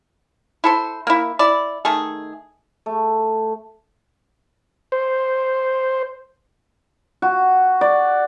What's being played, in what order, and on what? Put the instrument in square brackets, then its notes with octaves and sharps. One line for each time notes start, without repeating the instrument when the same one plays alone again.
[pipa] E4 A4 C5
A#3 E4
E4 D5
D#3 A3 G#4
[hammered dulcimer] A3
[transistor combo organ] C5
[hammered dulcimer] F#4
D5